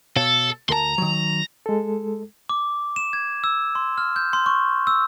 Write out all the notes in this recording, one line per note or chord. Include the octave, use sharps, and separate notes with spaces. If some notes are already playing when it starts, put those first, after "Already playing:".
B2 A4 C#5 F5
D2 A#4 A5 A#5 C6
D#3 F#3
G#3 A4
D6
E7
G#6
E6
C6
F6
G6
C6
C#6
E6